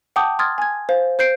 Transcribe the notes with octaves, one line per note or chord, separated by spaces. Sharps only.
F#5 G5 A5 D6 D#6 G6
C6 D#6 F6 G#6 A6
G#5 G#6
C5 F5
C5 G6 C7 D7